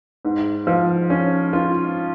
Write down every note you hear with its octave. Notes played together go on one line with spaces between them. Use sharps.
G#2
F3
C#4
F4